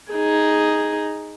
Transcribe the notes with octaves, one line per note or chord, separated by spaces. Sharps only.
D#4 G#4